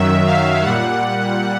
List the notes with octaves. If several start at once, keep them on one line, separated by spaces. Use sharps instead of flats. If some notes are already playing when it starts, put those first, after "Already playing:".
Already playing: F#2 D#3 F#3 E5
F5
A#2 G3 F#5